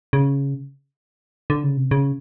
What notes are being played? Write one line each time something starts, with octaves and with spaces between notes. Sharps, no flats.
C#3
D3
C#3
C3
C#3